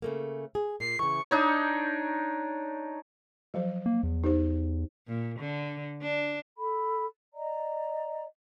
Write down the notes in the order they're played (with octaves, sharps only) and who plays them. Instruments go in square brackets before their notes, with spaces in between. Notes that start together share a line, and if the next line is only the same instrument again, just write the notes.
[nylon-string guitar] C#3 A3 A#3
G#4
[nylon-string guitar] A#2 [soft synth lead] C7
[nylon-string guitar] C#3 E3 [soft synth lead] C#6
[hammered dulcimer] D4 D#4 C#5
[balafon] F3 F#3 C5
[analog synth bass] A#3
E2
[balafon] D#4 G4 C5
[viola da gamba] A#2
D3
D4
[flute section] A4 B5
D5 D#5 A#5